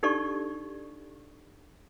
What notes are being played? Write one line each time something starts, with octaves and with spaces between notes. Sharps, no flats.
D4 D#4 G4 A4 D5 C#6